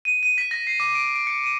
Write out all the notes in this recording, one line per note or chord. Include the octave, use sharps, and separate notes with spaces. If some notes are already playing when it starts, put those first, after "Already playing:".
D#7
D#7
B6
A#6
C7
D6
D7
D7
C#7
D#7